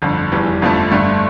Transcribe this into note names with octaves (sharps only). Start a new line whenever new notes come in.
G1 F2 D3
F1 E2 E3 G3
G1 F2 D3 F3 A3
G1 G2 D3 A3